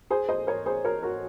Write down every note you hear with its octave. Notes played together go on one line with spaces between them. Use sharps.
G#4 C5
C5 D#5
A#4 C#5
G#4 C5
A#4 C#5
F#4 A#4